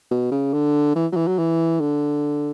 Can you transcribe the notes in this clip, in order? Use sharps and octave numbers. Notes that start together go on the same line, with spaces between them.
B2
C#3
D3
E3
F#3
E3
F#3
E3
D3